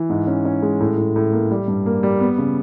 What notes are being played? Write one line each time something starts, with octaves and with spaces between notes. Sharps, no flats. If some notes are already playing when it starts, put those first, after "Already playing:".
Already playing: E3
G#2
C#4
C#4
G#3
A2
A2
A2
A#3
G3
G2
A#3
G3
B3
C#3